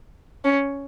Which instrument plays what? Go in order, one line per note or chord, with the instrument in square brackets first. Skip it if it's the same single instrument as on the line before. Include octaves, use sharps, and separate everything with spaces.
[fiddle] C#4